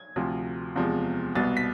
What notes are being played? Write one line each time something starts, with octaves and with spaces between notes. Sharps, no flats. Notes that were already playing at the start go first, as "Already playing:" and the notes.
Already playing: G#6
D2 C3 F3
E2 C3 F3 G#3
C2 B2 B3 A6
B6